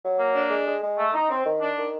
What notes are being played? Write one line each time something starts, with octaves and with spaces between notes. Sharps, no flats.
F#3
A#3
D4
G#3
G#3
G#3
A3
D#4
C4
D#3
D4
D#3